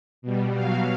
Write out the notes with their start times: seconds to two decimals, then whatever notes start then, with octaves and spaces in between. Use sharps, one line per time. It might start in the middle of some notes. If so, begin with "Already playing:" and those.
0.22 B2 G3
0.54 B2 F#3 F5